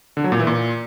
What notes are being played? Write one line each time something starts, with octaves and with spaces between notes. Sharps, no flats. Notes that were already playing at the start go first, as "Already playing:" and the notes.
D3
F#3
A#2
E3
A#2